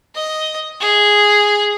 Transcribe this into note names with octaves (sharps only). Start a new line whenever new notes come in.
D#5
G#4